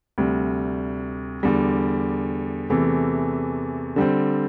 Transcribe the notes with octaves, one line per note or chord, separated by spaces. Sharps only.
D2 C3 G3
E2 D3 G3
E2 C3 E3 A3
D3 G3 C4